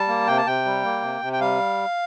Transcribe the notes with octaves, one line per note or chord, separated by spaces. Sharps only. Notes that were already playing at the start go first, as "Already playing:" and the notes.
Already playing: G3 A5
A#3
C3 G5
A5
C3 G5
G3
A#3
C3
C3
G5
G3 F5